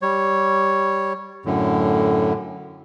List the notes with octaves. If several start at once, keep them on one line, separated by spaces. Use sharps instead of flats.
G3 C#5
F#2 A2 D3